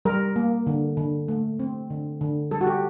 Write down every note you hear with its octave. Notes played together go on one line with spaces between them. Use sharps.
G3 A#4
A#3
D3
D3
A3
C4
D3
D3
G3 A4
F#4
G4